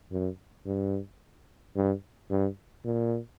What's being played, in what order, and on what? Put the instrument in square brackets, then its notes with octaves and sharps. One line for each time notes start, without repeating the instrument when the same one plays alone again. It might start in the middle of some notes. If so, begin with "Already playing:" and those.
[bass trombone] F#2
G2
G2
G2
A#2